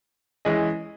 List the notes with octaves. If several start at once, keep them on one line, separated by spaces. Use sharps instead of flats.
E3 G#3 C#4 G#4 D#5